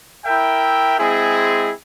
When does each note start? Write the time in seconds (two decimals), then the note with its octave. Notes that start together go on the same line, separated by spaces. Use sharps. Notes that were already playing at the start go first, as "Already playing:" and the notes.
0.25 E4 A#4 E5 G5
0.99 G#3 C4 E4 G#4